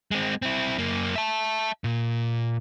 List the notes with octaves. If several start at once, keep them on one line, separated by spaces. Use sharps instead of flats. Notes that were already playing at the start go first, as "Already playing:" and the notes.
G#3 C4
C4 E4
F#2 A#3
E5 A5
A#2